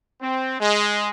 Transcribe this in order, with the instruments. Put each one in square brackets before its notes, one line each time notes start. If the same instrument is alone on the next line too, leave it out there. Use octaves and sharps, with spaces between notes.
[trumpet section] C4
G#3